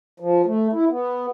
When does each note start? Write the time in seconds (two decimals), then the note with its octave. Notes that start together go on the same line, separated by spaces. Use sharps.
0.20 F3
0.46 A3
0.73 E4
0.89 B3